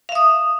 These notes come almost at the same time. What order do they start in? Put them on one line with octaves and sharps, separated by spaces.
F5 E5 D#6